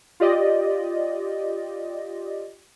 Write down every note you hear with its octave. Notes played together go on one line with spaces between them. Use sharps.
F4 G4 D5 D#5